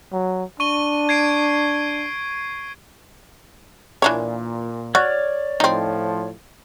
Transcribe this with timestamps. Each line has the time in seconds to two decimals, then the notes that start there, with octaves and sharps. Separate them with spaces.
0.13 F#3
0.60 D4 C#6 D#7 G7
1.09 G#6 C7 D7
4.02 A#2 E3 D4 C#5
4.95 F#4 C#5 D5 F6
5.60 A2 F3 C4 D#4